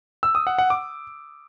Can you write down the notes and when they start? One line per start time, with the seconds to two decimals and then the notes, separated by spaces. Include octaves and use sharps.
0.23 E6
0.35 D#6
0.47 F#5
0.58 F#5
0.70 D6